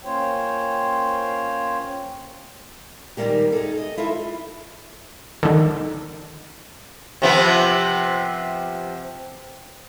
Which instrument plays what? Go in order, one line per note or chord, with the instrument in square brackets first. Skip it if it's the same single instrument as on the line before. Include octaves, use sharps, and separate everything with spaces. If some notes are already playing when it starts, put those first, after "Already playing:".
[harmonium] A#3 C#4 F4 C5 C#5 G5
[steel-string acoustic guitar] A#2 D#3 E3 G3 A#3 G4
D#4 G#4 A4
D#5
E4 F4 A4
[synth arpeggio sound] D3 D#3
[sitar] C3 F3 B3